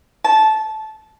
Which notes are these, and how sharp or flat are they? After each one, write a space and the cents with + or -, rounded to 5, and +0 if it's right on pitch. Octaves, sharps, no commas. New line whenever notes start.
A5 -15